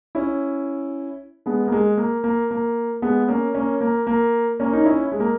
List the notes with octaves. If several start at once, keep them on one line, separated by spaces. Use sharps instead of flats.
C#4 E4
G#3 B3
A#3
G#3
A#3
A#3
A#3
G#3 B3
A#3 C#4
A#3 C#4
A#3
A#3
A#3 C#4
D#4
C#4 E4
G#3
A#3